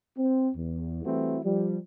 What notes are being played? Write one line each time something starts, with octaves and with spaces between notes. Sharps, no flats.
C4
E2
E3 G3 A3 C4 E4 F#4
F3 G3